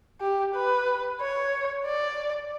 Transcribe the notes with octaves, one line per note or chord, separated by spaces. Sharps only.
G4
B4
C#5
D5